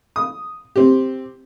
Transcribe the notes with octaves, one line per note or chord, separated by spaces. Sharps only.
D#6
C4 G4